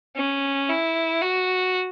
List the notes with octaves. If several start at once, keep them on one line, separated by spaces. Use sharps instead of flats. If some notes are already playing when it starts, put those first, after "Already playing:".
C#4
E4
F#4